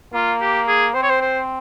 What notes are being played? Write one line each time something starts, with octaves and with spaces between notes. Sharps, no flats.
A#3 F4
G4
G#4
C4 C5
C#5
C5
C5